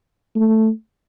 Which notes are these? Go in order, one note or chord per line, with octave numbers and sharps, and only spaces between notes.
A3